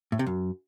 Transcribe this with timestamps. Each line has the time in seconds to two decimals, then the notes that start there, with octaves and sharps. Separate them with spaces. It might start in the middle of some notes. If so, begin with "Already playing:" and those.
0.12 A2
0.19 C3
0.26 F#2